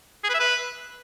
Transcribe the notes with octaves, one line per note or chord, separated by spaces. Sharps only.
G#4
B4
E5
B4